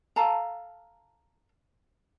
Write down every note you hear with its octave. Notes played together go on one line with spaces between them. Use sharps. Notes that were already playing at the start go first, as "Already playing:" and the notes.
A4 F5 A5 A#5